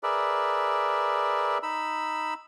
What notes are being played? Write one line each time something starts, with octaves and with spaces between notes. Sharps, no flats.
G#4 A#4 B4 D5 E5
D#4 B5 E6